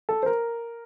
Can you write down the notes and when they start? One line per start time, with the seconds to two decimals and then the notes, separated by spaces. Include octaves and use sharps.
0.09 A4
0.23 C5
0.26 A#4